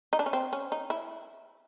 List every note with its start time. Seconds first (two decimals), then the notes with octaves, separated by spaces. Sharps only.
0.13 D#4
0.19 D4
0.26 C#4
0.33 C4
0.53 C#4
0.72 D#4
0.90 E4